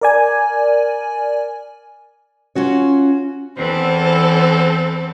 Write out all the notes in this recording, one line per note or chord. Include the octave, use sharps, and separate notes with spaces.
A#4 D5 G#5
C#4 F4 F#4 C#5
E2 E3 C4 A4